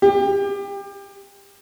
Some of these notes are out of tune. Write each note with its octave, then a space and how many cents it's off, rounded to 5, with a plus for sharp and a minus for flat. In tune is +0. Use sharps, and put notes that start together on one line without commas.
G4 +30